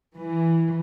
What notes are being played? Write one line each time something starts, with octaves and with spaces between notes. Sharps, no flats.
E3